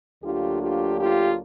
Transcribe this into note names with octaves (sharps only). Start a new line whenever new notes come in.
D2 D3 F#3 A#3 D4 F4 G4
F4 G4
F4 G4